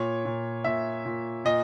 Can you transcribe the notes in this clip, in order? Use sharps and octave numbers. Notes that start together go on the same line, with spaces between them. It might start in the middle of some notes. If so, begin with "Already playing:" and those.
Already playing: A#2 C#5
A#2
A#2 E5
A#2
A#2 D#5